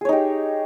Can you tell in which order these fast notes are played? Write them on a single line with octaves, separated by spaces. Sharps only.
G#4 C#5 D#4 G4